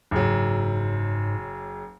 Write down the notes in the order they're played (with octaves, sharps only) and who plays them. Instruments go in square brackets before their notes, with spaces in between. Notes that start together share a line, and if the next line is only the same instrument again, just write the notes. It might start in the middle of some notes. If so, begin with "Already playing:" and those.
[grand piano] F#1 F#3 [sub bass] G#2